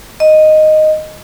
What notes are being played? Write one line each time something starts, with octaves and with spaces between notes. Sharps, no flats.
D#5